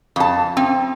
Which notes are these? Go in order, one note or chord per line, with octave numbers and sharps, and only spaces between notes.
F2 A5
C4